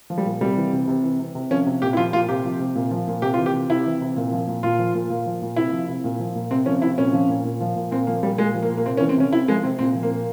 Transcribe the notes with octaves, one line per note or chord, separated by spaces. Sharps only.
F3
G3
A#2
C3 G3
E3
C3
C3
E3
C3
C3
F3 C#4
C3
A#2 G4
E4
F3 F4
A#2 F4
C3 G4
F3
C3
A#2
F3
A#2
C3 G4
F4
E3
G4
C3
C3 E4
E3
C3
A#2
F3
A#2
A#2 F4
F3
A#2
A#2
F3
A#2
C3 E4
F3
C3
A#2
F3
A#2
C3 C4
F3 C#4
C3 E4
A#2 C#4
F3
A#2
A#2
F3
A#2
A#2 C4
F3 A#3
A#2 G3
A#2 G#3
F3
A#3
A#2
A#3
C3 C4
C#4
E3
C4
C3 C#4
C3 E4
F3 G#3
C3 C4
A#2 C4
F3
A#3
A#2